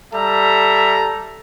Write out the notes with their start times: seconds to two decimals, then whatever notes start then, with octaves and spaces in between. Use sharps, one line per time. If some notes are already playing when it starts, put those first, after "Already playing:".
0.14 G3 A4 E5 A#5